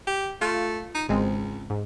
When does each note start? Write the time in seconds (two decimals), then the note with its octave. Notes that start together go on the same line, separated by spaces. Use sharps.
0.07 G4
0.41 A3 F4
0.95 D#4
1.09 G#1 C#2 G#3 C4
1.70 G#2